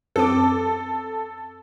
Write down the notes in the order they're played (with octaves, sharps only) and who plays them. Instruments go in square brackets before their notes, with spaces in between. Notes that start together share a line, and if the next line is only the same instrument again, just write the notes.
[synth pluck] F#2 C4 D6 [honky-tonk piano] A4